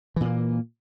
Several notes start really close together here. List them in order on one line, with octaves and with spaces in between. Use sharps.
E3 A#2 A#3